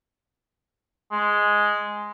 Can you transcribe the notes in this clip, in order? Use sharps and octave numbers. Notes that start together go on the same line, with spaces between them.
G#3